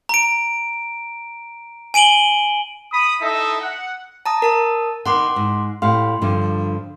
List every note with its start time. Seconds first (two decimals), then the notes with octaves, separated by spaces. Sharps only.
0.09 A#5 D7
1.94 G#5 D7 D#7 F#7 G7
2.92 B5 D#6
3.21 D#4 E4 A4 D#5 E5
3.61 F#5
4.26 A5 A#5 D#6
4.42 A#4 A5 D#6
5.06 D#3 B3 F#5 C6 D6
5.36 G#2
5.82 A2 G4 F5 C6
6.22 G2 D3 F3